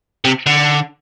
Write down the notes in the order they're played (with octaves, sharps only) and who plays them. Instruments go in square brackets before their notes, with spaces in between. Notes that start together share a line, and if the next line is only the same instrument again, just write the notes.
[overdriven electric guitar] C3
D3